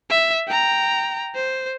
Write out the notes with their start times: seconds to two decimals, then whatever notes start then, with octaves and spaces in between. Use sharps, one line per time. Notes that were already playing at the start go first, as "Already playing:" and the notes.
0.10 E5
0.48 G5 A#5
1.35 C5